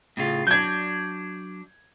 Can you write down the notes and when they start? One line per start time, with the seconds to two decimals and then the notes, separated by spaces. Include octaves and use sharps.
0.17 A2 C#3 F4
0.47 F#3 D4 G6 G#6